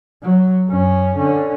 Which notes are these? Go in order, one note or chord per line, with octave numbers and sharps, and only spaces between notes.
F#3
F#2 C#4
D3 C#4